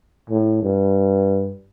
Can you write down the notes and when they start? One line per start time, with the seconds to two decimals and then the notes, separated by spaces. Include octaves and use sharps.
0.30 A2
0.62 G2